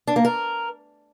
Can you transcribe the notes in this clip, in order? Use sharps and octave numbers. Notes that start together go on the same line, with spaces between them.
D4
A#3
A#4